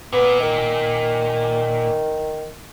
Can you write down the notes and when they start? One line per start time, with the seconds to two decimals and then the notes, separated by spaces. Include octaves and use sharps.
0.12 A#2 B3
0.40 D#3